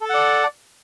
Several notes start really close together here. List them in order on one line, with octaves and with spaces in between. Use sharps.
A4 A5 F#5 D5